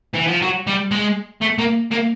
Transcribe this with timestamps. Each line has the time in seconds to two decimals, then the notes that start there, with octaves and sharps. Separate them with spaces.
0.14 E3
0.27 F3
0.42 F#3
0.67 G3
0.91 G#3
1.41 A3
1.58 A#3
1.91 A#3